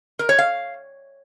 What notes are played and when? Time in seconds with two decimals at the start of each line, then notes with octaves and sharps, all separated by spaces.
0.19 A#4
0.29 C#5
0.39 F5